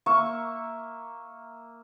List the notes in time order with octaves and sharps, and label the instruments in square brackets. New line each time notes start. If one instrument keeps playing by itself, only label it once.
[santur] A#3 E5 A#5 C#6